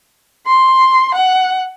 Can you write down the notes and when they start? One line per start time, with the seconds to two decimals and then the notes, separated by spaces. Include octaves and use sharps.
0.47 C6
1.14 F#5